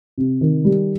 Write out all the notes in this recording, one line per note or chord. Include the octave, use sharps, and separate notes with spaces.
C3
D#3
G3